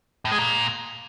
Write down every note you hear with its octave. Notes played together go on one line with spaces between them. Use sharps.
A2
G#3
A#2